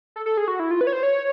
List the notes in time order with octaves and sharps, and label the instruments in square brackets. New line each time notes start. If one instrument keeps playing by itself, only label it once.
[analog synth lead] A4
A4
G#4
F#4
E4
F4
B4
C#5
C5
C#5